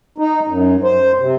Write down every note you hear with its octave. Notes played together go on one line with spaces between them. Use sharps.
D#4
F#2
C5
C3